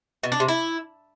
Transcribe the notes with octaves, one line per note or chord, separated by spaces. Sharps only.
B2
D4
C3
E4